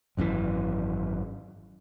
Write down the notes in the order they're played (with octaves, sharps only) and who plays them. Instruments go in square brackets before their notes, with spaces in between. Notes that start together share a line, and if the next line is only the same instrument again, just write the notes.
[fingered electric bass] G#1 F#2 B2 E3